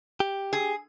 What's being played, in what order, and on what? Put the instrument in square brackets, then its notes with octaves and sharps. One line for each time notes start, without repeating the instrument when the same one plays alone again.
[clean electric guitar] G4
[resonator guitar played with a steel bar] G#4